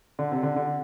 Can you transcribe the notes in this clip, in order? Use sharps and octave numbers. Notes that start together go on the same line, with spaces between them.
D3
C3
D3
D3